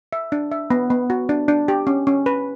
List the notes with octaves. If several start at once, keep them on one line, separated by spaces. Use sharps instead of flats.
E5
D4
E5
B3
B3
F#4
D4
D4
G4
C#4
C#4
B4